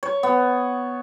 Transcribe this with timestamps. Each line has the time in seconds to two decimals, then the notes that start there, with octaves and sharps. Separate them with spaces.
0.03 C#5
0.23 B3